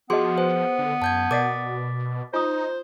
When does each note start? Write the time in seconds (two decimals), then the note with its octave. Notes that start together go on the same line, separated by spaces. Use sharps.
0.10 F3 B3 F#4 G#4 D#5 C6
0.38 B4 C5
0.79 D3
1.02 F#2 A5 G6 G#6
1.31 B2 A#4 D5 F#5 D6 A6 B6
2.34 D#4 F4 C5 D#6